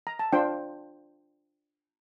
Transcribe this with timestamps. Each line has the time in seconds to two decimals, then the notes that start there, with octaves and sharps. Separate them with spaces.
0.07 A#5
0.19 A5
0.32 D4 F4 C5 G5